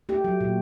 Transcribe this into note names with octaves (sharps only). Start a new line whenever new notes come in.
A3 G4
F#3
A#2